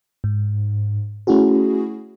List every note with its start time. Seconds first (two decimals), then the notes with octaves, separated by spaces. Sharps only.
0.24 G#2
1.27 A3 C#4 E4 F#4 G#4